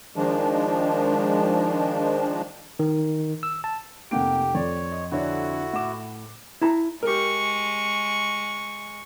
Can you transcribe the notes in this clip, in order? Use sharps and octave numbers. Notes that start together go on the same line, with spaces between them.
D#3 F3 G#3 D4
D#3
E6
A5
F1 C3 A3 A#3 G4 F#5 D7
F2 C#5 D5
D#5
D3 E4 F#4 C#5 D5
A2 F#5 D6 E7
E4 A5 A#5
G#3 G4 A#4 C#6